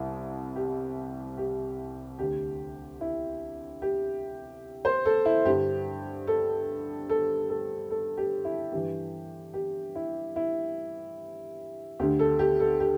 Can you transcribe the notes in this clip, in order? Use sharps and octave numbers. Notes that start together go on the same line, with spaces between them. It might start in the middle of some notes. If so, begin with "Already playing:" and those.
Already playing: C2 C3 E4
G4
G4
D2 D3 G4
E4
G4
C5
A4
E4
G2 D3 G4
A4
A4
A4
A4
G4
E4
G2 E3 G4
G4
E4
E4
D2 D3 G4
A4
G4
A4
G4